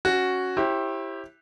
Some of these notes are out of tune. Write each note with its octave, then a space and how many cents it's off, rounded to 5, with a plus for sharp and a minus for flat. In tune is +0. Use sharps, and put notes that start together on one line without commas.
C#4 +0 F#4 +0
E4 +0 G4 +0 C5 +45